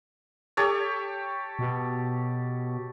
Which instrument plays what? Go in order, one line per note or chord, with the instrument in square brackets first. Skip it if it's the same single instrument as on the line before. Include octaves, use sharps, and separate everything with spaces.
[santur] G4 A4 C#5
[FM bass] B2